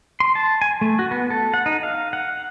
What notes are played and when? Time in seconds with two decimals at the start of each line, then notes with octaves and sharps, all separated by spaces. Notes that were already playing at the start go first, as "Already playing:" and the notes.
0.20 C6
0.35 A5
0.62 G#5
0.81 A3
0.99 F#4
1.11 B3
1.30 A4
1.54 F#5
1.66 D#4
1.83 F5
2.13 F#5